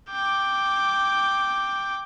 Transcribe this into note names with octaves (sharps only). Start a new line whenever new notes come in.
G5 D6